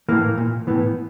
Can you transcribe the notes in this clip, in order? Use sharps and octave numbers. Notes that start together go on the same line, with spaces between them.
A2 E3 A#3
A#2
A2 E3 B3